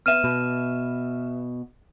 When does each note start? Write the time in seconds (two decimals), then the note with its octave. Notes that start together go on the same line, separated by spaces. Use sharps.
0.06 B3 E5 F6 D#7 E7
0.24 B2